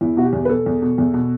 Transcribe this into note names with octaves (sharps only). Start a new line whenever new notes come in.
E2 E4
B2 F#4
G4
E2
B4
B2 A4
E2
B2
E2
B2